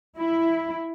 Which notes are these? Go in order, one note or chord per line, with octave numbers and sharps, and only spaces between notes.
E4